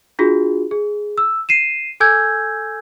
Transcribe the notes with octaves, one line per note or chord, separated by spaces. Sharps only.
D4 F4 F#4 G#4
G#4
E6
C7 D#7 E7
A4 G#5 E6 G6 G#6